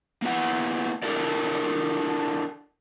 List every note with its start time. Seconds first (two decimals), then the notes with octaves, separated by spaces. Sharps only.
0.22 A#3 B3 E4 F#5
1.03 D4 E4 G4 A4 A#4 D5